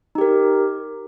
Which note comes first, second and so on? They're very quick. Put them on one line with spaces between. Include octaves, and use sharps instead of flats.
D#4 G4 A#4